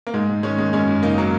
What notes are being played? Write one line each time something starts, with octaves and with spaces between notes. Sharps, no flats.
A#3
G#2 G#3
G#2
D#3 G#3 C#4
D#3 G#3
F#2 G#3 C#4
F#2
C#3 A#3 D#4
F#3 A#3